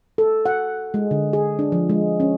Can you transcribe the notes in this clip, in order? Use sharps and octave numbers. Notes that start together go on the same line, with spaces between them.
A4
F#5
G#3
D3
G#4
D4
F3
G#3
C#4